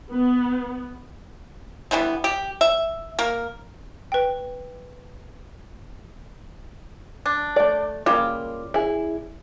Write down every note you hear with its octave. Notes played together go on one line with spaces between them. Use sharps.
B3
D3 E3 G3 B3
G4
E5
A#3 A#4
B4 G5
D4
A3 D5
C#3 G3 A#3 F4
E4 G#4